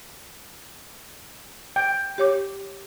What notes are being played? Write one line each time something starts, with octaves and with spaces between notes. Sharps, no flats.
G5
G4 C#5 D6